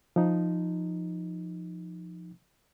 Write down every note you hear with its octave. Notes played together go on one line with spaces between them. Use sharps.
F3 D#4